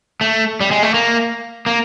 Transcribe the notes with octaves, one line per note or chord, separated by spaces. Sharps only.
A3
G3
G#3
A3
A#3
A#3